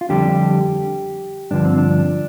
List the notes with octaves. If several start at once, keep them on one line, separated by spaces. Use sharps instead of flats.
F4
F2 D3 G3 G4
G2 D3 F3 D4
C4
D4